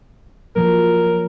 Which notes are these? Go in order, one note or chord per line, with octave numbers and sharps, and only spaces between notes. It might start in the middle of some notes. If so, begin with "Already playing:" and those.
F3 F#3 A#3 A#4